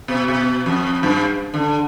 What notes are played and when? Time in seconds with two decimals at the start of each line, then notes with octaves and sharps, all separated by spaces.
0.08 B2
0.28 B2
0.66 F2
1.03 G2
1.54 D3